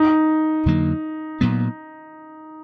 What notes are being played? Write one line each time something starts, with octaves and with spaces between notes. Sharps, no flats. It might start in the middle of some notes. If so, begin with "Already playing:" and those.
Already playing: D#4
F2 D3 F#3 A#3
A#2 F#3 B3